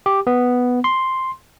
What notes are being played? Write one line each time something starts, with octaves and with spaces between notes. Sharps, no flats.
G4
B3
C6